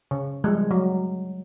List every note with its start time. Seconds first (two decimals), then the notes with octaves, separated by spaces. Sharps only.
0.11 C#3
0.44 F3 G3 G#3
0.71 F#3